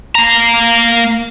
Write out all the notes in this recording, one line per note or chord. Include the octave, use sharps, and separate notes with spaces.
A#3 A#5